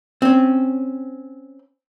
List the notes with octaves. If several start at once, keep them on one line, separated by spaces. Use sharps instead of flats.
C4 C#4